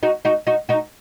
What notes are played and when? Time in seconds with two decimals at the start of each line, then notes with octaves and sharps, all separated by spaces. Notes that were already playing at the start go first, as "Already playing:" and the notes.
0.03 D#4 F#4
0.25 D#4 F#4
0.47 D#4 F#4
0.69 D#4 F#4